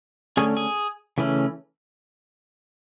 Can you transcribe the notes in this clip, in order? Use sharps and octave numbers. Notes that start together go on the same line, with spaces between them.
D3 A3 C#4 G#4 G#5
G#4 G#5
C#3 E3 A3 C#4